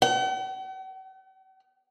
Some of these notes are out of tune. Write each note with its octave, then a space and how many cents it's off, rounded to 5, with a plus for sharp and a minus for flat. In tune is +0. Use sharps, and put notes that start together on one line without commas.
F#5 +45